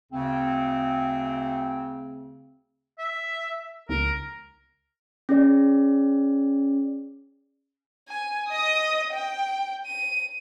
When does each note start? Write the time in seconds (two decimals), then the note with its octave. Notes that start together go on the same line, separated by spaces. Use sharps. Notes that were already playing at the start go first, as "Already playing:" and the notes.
0.11 D2 C#3 C4
2.99 E5
3.89 C#2 A#4
5.29 C#4 G#4 D5
8.08 G#5
8.50 D#5 D#6
9.13 G5
9.86 D#7